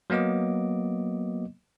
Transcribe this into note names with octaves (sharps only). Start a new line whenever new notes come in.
F#3 A#3 B3 D#5 D6